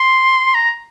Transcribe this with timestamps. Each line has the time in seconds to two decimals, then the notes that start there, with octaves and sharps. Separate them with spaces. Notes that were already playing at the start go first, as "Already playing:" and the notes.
Already playing: C6
0.54 A#5